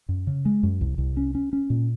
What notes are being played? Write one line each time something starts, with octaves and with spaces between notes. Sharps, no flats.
F#2
C#3
G#3
F#2
C2
C2
C#4
C#4
C#4
A#2